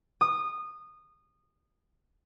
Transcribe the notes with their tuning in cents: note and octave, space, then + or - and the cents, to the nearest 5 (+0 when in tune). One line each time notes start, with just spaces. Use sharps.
D#6 -20